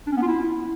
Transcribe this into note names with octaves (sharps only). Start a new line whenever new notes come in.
D4
C#4
B3
F4
E4